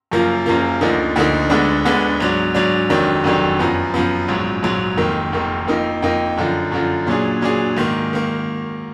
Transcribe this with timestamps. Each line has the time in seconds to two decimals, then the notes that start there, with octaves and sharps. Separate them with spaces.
0.11 F#1 F#2 F3 A#3 F4
0.46 F#1 F#2 F3 A#3 F4
0.81 D2 D3 F3 A#3 D#4
1.16 D2 D3 F3 A#3 D#4
1.50 D2 D3 G#3 B3 D4
1.85 D2 D3 G#3 B3 D4
2.20 G#2 F#3 D4
2.55 G#2 F#3 D4
2.90 F1 F2 D#3 F#3 D4
3.24 F1 F2 D#3 F#3 D4
3.59 F#2 F3 B3
3.94 F#2 F3 B3
4.28 A#1 G#2 F#3
4.63 A#1 G#2 F#3
4.97 F1 F2 D#3 A#3
5.32 F1 F2 D#3 A#3
5.67 F2 F3 A#3 D#4
6.02 F2 F3 A#3 D#4
6.37 F#2 D3 F3
6.72 F#2 D3 F3
7.06 A#2 F#3 D4 G#4
7.41 A#2 F#3 D4 G#4
7.77 G#2 D#3 A#3
8.13 D#3 A#3